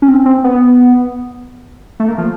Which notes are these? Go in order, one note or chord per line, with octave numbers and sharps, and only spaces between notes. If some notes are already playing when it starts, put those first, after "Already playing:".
C#4
C4
C4
B3
A3
A#3
F3